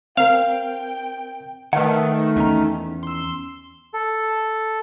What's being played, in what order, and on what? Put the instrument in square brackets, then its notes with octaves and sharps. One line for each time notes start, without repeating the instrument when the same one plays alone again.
[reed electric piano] C4 A#4 [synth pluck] F5 [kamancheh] G5
[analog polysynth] D#3 A3 [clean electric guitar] B4 F#5
[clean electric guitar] E2 C#4 A#5
[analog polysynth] C6 E6
[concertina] A4